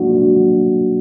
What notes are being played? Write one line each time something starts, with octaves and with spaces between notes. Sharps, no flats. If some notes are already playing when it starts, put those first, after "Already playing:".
Already playing: F#3 A#3 D4 F#4